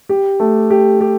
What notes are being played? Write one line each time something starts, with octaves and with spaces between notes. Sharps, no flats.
G4
A3
G4
G4